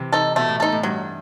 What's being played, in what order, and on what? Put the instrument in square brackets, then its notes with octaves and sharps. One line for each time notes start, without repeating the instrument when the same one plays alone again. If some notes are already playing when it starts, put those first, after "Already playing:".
Already playing: [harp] C3 E3
[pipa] D#4 A4
[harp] B2 [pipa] A3
[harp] A2
[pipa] D#4 A4
[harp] A2
[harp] G2 [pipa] F#3